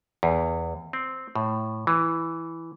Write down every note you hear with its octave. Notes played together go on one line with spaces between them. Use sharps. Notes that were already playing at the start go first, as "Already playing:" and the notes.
E2
C4
A2
E3